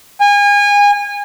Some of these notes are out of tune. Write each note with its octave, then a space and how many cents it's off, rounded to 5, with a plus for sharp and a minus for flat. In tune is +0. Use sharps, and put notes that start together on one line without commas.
G#5 -30